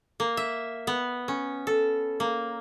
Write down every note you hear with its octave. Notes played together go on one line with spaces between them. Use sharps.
A#3
E5
B3
C#4
A4
A#3